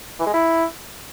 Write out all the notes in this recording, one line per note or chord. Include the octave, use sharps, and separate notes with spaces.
E3
G#3
E4